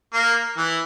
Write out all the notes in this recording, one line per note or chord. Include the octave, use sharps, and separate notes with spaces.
A#3
E3